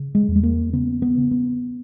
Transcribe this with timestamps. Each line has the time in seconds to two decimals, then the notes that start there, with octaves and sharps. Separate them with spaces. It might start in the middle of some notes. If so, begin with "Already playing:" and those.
Already playing: C#3
0.15 G#3
0.28 E2
0.36 G#3
0.43 A#3
0.73 C#3 B3
1.02 B3
1.17 C#3
1.31 B3